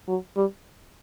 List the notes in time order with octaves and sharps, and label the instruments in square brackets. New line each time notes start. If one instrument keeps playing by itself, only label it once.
[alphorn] F#3
G3